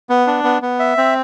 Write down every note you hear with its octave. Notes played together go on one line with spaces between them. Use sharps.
B3
D4
B3
B3
E5
C4